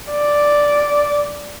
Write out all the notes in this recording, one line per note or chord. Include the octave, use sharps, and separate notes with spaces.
D5